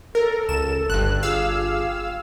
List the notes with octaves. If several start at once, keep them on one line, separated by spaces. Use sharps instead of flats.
A4 A#4
C#2 E7
G1 G2 F#6
F4 G4 G#4 F5 E6